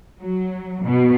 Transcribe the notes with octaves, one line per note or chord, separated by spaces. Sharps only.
F#3
B2